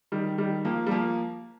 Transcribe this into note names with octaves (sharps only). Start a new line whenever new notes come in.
D#3 G3
D#3 G3
F3 A#3
G3
F3 A#3